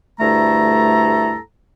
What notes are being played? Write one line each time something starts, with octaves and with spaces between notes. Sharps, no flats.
D2 G2 A3 E4 A4 A#5